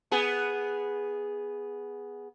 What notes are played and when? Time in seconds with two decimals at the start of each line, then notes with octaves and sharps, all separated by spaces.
0.11 B3 G#4